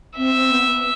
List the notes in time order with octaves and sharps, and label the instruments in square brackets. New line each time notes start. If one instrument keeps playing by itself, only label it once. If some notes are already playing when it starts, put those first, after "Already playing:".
[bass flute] C4 [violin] E5
[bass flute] C4
B3